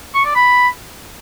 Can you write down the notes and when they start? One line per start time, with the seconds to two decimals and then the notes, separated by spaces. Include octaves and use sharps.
0.14 C#6
0.25 D5
0.35 B5